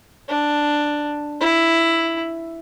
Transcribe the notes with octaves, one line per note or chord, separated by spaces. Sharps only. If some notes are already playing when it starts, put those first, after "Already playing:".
D4
E4